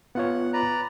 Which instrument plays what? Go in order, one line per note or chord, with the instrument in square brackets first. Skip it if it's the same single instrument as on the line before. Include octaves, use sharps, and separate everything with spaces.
[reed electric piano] B3 F4 C#5 [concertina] F#5
[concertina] B4 D5 A#5